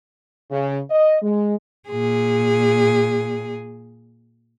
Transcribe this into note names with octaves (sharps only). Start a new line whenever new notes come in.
C#3
D#5
G#3
A#2 G#4